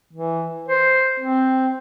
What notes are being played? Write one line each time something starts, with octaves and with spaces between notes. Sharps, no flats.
E3
C5
C4